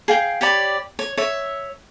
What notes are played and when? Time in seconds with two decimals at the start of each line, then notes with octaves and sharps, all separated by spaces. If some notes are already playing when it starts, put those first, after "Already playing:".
0.08 G#4 F5 G5
0.41 G4 C#5 D5 B5
0.99 C#5
1.18 C#5 E5